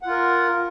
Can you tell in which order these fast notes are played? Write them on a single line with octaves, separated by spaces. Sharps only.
F#5 F4 A#4